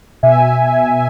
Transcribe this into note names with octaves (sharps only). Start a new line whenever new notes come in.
B2 E5 G#5